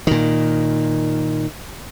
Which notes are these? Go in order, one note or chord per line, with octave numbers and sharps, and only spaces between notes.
A#2 D#3